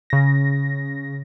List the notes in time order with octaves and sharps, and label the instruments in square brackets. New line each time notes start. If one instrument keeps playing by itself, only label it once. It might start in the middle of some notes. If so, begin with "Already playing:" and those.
[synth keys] C#3 A#6